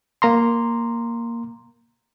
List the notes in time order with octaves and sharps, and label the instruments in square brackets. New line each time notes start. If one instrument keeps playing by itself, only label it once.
[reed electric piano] A#3 A#5 C6